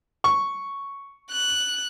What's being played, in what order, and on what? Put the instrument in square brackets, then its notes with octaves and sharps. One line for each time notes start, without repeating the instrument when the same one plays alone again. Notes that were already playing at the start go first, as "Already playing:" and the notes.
[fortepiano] C#6
[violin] F#6